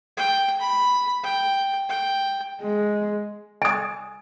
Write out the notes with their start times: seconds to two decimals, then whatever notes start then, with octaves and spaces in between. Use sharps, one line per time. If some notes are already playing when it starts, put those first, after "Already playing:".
0.17 G5
0.60 B5
1.23 G5
1.89 G5
2.62 G#3
3.62 G#5 D#6